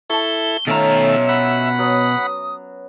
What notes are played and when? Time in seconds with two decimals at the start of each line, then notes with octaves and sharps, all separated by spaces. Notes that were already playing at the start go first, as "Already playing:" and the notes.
0.10 E4 A4 A5 C#6 G7
0.67 B2 D#3 A3 C#4 F4 E5 A#5
1.29 F#5 B5
1.78 F#3 B3 D#6